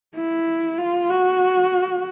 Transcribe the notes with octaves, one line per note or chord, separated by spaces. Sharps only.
E4
F4
F#4